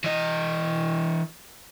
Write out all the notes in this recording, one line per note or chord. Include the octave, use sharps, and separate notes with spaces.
E3 D#5